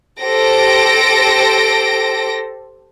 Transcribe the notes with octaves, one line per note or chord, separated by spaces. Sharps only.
G4 A4 C5 A#6 D7